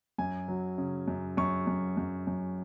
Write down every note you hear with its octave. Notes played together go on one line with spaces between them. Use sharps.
F#2 G#5
F#3
C#3
F#2
F#2 C#6
F#2
F#2
F#2